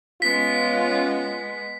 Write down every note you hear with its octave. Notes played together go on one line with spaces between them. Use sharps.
G#3 B3 C#4 F4 B6